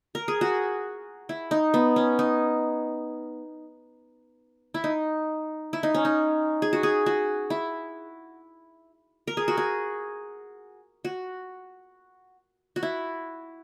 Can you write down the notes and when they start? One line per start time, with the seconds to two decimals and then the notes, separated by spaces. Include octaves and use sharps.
0.15 A#4
0.28 G#4
0.41 F#4
1.29 E4
1.51 D#4
1.74 B3
1.96 C#4
2.19 D#4
4.74 E4
4.84 D#4
5.73 E4
5.83 D#4
5.95 C#4
6.05 D#4
6.62 G#4
6.73 F#4
6.83 G#4
7.06 F#4
7.50 E4
9.27 A#4
9.37 G#4
9.48 F#4
9.57 G#4
11.05 F#4
12.76 F#4
12.83 E4